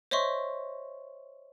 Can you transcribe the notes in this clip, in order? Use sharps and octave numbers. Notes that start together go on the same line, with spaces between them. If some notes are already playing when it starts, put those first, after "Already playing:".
C5 C#5 D#5 E5 C6 C#6